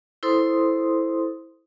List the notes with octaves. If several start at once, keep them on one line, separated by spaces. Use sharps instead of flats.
E4 A4 C5 C6 D#6